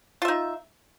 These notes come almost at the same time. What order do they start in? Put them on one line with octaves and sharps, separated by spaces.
F4 E5 D#4